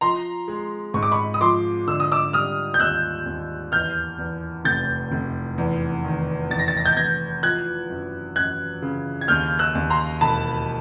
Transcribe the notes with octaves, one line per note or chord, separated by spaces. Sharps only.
F3 A#5 C6
G#3
G#2 C#6
D6
B5 C#6
D#6
F3 C6 D6
D3 E6
D#6
D6 E6
G3 D#6 F6
G6
D#2 E6 F#6
D#2
E2 F6 G6
E2
F1 G6 A6
F1
E2
D#3
E2 A6
A#6
A6
A#6
G6 A6
E2 G#6 A#6
F3 F#6 G#6
F#2
F#2 F#6 G#6
C#3
G#6
D#2 F6 G6
E6 F#6
D#2
A#5 C6
E1 A5 B5